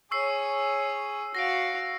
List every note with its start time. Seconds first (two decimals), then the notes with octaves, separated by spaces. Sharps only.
0.11 G#4 C#5 C#6 E6 C7
1.35 F#4 F5 A#6 C7 D7